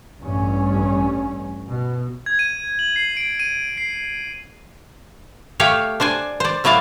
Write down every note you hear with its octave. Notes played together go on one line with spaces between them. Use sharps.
A1 G2 C#4
B2
G#6
D#7
F#7
C7
D7
D#7
C7
A3 G4 C#5 F5 G5
D4 C5 D5 G#5
C5 D5
A2 F#3 E4 D5 F5